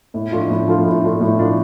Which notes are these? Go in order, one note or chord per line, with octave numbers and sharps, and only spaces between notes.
A2
F3 A3 D4 F4
A2
F3 A3 D4 F4
A2
F3 A3 D4 F4
A2
F3 A3 D4 F4